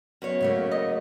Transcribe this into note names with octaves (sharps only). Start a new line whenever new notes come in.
F#2 B3 C#5
C#3 A3 A#3
D#5